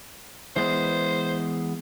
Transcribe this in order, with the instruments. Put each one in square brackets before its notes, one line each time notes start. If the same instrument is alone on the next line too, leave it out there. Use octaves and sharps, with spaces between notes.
[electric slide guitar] E3 G#3 B3 [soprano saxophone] C5